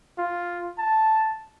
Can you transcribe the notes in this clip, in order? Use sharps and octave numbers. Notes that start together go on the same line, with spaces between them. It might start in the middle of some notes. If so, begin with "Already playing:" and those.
F4
A5